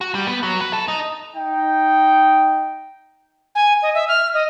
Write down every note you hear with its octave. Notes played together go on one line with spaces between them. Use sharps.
F#4
G3
B3
F#3
B4
A4
D#4
D#4 G5
G#5
D#5
E5
F6
D#5